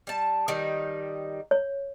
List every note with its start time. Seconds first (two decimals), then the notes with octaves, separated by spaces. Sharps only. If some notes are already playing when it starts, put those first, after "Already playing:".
0.07 G3 A5
0.48 D#3 G3 D#4
1.51 C#5